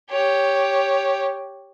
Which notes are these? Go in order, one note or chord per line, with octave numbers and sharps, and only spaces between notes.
G4 C#5